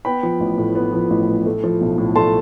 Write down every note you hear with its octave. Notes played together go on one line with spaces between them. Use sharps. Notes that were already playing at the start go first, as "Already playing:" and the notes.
B3 G5 B5
F3
A1
A2
B3
F3
A1
A2
A3
F3
B1
A2
A3 A5 C6